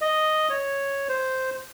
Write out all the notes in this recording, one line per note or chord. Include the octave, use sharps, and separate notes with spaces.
D#5
C#5
C5